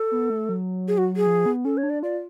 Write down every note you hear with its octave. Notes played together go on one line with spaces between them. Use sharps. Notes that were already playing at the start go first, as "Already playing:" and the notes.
Already playing: A4
B3
A3
F#3
G#4
F#4
G#4
F3
B3
C#4 A4
C#5
D4
D5
F4 D5